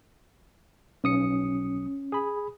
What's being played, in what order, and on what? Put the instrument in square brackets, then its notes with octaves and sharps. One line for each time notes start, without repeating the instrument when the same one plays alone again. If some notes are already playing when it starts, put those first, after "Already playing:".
[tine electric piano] B1 D#6 C#7 [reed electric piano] C#4
[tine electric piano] G#4 B5